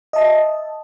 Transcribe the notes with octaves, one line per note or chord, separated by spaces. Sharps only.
D#5 E5 A5